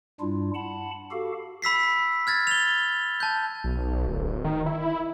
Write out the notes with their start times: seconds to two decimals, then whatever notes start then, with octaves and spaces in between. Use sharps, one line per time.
0.20 G2 G3 D4 E4 F4
0.55 F#5 A5 B5
1.11 F#4 G4 A4 F5
1.62 B5 E6 B6 C7
2.27 F6 G#6 A6
2.47 F7 G7
3.20 A5 G6
3.64 B1
4.07 D1
4.45 D#3
4.66 E4